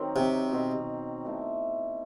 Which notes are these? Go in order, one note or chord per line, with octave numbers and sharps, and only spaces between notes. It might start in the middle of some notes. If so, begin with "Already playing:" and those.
Already playing: D#3 F#3 C4
C3
B2 F#3 C4
B2 A3 E4